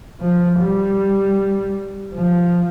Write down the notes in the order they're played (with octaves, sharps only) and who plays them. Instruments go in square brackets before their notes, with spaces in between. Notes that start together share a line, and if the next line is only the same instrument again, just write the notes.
[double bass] F3
G3
F3